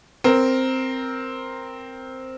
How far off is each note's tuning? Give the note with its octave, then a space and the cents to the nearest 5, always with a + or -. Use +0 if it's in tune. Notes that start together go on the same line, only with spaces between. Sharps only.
C4 +0 A#4 +0